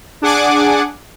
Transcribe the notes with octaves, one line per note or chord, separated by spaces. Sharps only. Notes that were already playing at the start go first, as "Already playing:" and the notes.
D4 G#4 F#5 G#5 D6